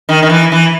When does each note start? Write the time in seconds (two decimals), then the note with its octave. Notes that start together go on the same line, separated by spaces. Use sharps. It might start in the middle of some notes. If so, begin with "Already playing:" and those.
0.09 D#3
0.23 D#3
0.29 E3
0.52 E3